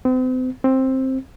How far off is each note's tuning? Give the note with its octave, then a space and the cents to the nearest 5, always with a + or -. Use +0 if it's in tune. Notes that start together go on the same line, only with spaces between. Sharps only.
C4 -40
C4 +10